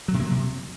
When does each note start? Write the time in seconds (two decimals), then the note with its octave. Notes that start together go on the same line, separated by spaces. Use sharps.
0.08 F#3
0.14 C3
0.20 A#3
0.25 F#3
0.31 C3